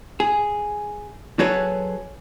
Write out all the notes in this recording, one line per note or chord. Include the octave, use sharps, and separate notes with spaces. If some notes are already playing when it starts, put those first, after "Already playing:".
G#4
F#3 F#4 G#4 A4 B4 C#5